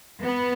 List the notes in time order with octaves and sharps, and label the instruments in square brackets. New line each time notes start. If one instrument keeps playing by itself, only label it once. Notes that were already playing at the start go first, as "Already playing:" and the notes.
[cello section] B3